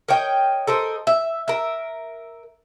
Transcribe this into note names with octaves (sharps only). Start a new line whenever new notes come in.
A#4 C#5 D#5 G5
A4 A#4 C5 D#5
E5
A#4 E5